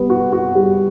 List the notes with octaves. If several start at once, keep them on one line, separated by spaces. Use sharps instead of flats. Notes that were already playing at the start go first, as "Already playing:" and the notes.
Already playing: G3 B3
F#4
F#4
G3